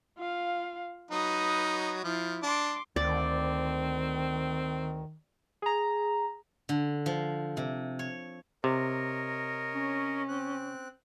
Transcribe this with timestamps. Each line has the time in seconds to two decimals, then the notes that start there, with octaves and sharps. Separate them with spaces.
0.18 F4 F5
1.11 F#3 D#4 B4 D#6
2.04 F3 E4
2.43 D4 C6 D6
2.96 D2 D#3 C4 D5
5.62 G#4 A#5
6.69 D3
7.06 F3
7.57 C3
7.99 C#5
8.64 C3 A#4 C#5 D#5
9.74 C#4
10.28 C4 F#6